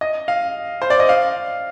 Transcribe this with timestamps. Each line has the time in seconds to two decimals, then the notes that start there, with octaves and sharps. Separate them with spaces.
0.01 D#5
0.28 F5
0.82 C5
0.90 D5
1.00 D#5
1.09 F5